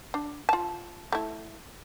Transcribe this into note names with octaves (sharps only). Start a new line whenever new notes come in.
D4
F4 A5
A3 E4